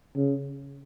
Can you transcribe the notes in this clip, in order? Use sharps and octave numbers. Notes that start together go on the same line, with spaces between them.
C#3